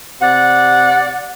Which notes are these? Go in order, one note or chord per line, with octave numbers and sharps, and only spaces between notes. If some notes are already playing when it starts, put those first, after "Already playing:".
C3 D5 F#5